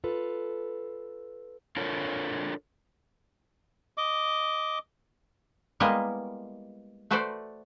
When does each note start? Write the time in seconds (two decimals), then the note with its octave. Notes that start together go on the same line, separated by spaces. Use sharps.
0.04 F4 A4 B4
1.77 D4 F4 A4 A#4 C#5
3.98 D#5 D6
5.80 G3 G#3 A#3 B3 E4 D#5
7.11 A3 F#4 A4 B4 C5 D5